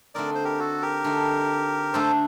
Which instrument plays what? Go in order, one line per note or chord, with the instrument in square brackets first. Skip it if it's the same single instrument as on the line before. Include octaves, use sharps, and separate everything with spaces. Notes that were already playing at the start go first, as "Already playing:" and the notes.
[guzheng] D3 A3 C4 D#4 [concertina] A#4 D5
[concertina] C5
G4 A#4
F#4 A4
G4 A#4
[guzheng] D3 A3 C4 D#4
[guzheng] D3 A3 D4 [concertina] A4 C5